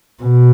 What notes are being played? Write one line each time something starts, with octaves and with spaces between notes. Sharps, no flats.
B2